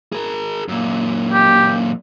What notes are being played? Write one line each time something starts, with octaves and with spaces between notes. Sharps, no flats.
G#4 A#4
F#2 A#2
G4